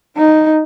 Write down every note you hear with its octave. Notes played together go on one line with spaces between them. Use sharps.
D#4